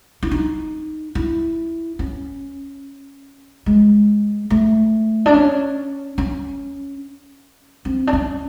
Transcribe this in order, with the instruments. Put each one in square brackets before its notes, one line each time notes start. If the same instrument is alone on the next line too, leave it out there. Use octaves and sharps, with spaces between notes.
[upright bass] E4
D#4
E4
C#4
G#3
A3
D4
C#4
C#4
C4
D4
C#4